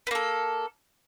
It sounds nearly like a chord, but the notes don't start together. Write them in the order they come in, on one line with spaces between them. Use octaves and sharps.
B3 A#3 A4